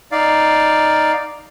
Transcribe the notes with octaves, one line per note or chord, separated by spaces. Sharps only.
D#4 D5 F5